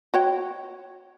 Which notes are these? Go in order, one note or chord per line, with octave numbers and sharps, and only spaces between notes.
F#4 C#5 G5